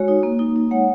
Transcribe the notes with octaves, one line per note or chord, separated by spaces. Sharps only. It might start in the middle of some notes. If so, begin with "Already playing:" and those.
Already playing: G#3 F#4 C#5
D#4
A#3
D#4
D#4
G#3 C#5 F#5